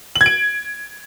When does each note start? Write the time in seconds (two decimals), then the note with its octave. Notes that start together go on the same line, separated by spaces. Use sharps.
0.16 F#7
0.21 G#6
0.26 D7